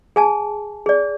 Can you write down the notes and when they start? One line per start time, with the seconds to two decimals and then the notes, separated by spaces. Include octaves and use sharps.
0.16 G#4 G#5 A5
0.86 G#4 D5